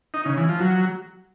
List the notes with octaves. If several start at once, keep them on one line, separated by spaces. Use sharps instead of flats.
D#4
C#3
E3
F3
F#3